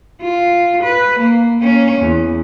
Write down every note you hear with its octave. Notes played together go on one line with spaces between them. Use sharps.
F4
B4
A#3
A#3 C#4
E2